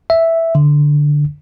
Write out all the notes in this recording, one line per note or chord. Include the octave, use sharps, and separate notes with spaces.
E5
D3